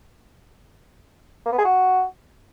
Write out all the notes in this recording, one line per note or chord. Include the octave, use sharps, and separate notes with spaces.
A#3
B3
G#4
F#4